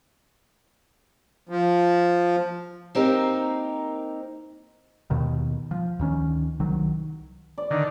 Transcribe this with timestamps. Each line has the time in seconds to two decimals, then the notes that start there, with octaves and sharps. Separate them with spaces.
1.49 F3
2.95 A#3 C4 D#4 G4 A#4
5.10 D#2 B2 D#3
5.71 F3
5.99 D2 D#3 C#4
6.60 C2 D#3 F#3
7.58 D5
7.71 D3 D#3